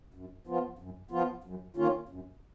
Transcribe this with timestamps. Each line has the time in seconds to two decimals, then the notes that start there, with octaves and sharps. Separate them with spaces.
0.14 F#2
0.47 F3 B3 F4
0.79 F#2
1.11 F3 B3 F4
1.44 F#2
1.76 D#3 A#3 C#4 F4
2.09 F#2